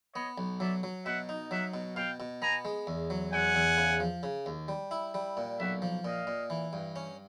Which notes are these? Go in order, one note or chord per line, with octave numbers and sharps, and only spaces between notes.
B3 C#5 D#5
B1
F#3 D5 E5
F#3
B2 E5 F#5
D#4
F#3 E5 F#5
B2
B2 F5 G5
B2
B3 G#5 A#5
G#3
E2
F#3
E2 F#5 G#5
E2
C#3
F3
C#3
D#2
G3
E4
G3
A#2
B1 E5 F#5
F3
A#2 D#5 F5
A#2
E3
G2
C#4